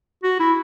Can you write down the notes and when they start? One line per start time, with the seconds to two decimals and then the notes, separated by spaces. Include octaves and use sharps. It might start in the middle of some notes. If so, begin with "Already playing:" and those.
0.24 F#4
0.40 E4